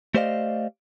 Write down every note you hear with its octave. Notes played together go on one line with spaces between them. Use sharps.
A3 G4 C5 D5 D#5 F5